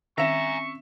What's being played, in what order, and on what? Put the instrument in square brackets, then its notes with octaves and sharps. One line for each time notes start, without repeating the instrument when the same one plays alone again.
[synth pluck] D#3 C4 C#4 [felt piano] E5 E7 [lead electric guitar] G#5 A#5 [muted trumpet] C#6